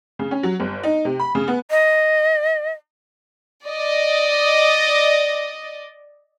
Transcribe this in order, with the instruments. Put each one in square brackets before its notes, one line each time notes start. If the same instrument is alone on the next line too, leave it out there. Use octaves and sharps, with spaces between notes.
[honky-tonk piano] C#3
C#4
F#3
G1
D#4
C3
B5
C#3
B3
[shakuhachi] D#5
[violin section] D5 D#5